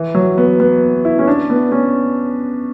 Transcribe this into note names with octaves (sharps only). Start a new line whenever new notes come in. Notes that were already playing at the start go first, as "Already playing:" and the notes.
Already playing: E3
F#3
B3
B3
E4
C#4
D4
B3
C#4